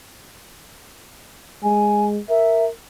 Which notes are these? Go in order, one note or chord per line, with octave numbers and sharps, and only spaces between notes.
G#3 G#5
A#4 E5